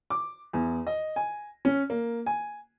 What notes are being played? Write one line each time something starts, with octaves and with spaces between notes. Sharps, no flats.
D6
E2
D#5
G#5
C#4
A#3
G#5